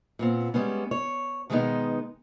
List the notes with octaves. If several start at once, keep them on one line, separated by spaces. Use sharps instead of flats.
A#2 B3 C4
G3 G#3 B3 C#4
C#5
B2 D#3 G#3 A#3 B3 D#4